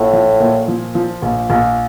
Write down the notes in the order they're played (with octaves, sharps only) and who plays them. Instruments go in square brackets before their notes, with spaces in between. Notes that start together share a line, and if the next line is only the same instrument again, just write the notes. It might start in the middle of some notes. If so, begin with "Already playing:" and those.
Already playing: [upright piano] A#1 [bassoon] A2
[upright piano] F3
A#2
F3
F3
A#1
A#1